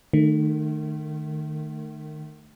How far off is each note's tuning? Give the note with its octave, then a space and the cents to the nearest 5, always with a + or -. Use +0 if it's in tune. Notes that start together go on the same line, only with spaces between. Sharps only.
D#3 -30 A3 +0